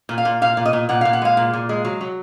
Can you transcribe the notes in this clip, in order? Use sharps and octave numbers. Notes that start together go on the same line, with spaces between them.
A#2
F5
A#2
A#2 F5
A#2
D#5
A#2
A#2 F#5
F5
A#2
F#5
G#3 F5
A#2
A#2
G#3
F#3
F#3